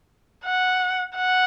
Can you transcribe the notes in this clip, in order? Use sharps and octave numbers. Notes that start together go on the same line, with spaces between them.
F#5
F#5